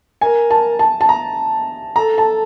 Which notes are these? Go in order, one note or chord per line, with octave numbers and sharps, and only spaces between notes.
A#4 G#5
A5
A5
A5
A#5
A4 A#5
A5